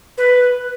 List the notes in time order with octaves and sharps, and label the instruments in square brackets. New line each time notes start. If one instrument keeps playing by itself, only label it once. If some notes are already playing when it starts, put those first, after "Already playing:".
[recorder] B4